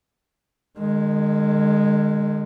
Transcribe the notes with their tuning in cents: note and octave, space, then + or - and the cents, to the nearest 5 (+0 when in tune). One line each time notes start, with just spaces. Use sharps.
D#3 -45 G#3 +0